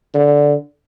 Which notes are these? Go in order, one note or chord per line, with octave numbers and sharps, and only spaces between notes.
D3